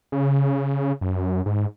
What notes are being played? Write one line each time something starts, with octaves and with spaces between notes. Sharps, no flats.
C#3
F#2
G#2